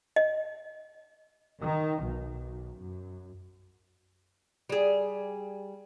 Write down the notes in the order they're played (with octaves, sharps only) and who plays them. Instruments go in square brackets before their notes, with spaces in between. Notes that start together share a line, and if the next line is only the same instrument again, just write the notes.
[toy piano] D#5
[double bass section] D#3
B1
F#2
[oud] G3 G#4